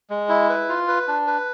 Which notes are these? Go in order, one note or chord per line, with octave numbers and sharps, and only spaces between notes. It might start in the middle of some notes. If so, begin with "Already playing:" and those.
G#3
E4
B4
F4
B4
D4
B4